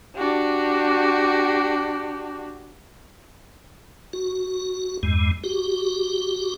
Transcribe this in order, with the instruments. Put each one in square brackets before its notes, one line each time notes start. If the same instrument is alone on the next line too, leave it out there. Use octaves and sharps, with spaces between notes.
[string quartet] D4 F#4 G4
[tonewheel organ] F#4
E2 G2 G#3
F#4 G4